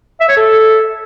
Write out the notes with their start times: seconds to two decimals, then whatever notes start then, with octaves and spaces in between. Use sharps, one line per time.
0.21 E5
0.29 C#5
0.37 A4